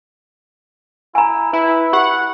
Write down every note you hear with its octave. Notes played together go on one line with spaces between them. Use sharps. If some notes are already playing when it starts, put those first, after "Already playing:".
E4 G#5 A#5
E4 B4
G4 F#5